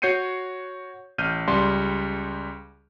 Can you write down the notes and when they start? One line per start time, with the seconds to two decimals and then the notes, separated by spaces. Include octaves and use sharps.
0.02 F#4 C#5 G6 C7 C#7 D#7
1.18 A1 F6 G6 D#7
1.48 C#2 G3 C6